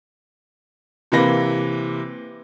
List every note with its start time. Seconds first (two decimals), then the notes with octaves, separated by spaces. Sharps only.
1.12 C3 E3 A#3 B4 A#6